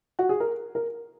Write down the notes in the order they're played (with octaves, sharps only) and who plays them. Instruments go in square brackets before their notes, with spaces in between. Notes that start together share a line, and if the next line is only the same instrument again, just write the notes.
[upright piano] F#4
G#4
A#4
A#4